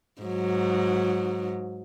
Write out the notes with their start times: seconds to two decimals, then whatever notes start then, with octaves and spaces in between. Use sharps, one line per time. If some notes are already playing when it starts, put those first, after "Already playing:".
0.22 G#2 F#3